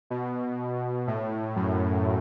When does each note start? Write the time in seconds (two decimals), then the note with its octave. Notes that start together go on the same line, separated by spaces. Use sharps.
0.10 B2
1.07 A2
1.56 F#2